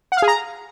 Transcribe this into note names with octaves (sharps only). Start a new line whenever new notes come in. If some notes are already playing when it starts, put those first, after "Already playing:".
F#5
F5
G#4
A#5